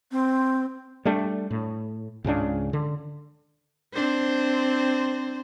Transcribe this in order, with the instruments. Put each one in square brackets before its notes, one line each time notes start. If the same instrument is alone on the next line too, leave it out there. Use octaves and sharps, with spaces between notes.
[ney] C4
[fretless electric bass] G3 A3 D4
A2
C#2 G#2 C#3 D4
D3
[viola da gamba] C4 D4 C5